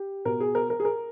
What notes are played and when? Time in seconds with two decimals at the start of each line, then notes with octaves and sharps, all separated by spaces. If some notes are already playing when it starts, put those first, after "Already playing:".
Already playing: G4
0.25 B2 A#4
0.40 G#4
0.55 A#4
0.70 A#4
0.80 G#4
0.85 A#4